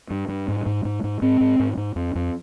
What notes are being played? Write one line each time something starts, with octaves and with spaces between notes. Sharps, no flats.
G2
G2
G#2
G#2
G#2
G#2
G#2 C4
G#2
G#2
G#2
F2
F2